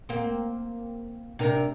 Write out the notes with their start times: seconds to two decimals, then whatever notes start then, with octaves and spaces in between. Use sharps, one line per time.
0.09 A#3 C4
1.39 C3 D4 A#4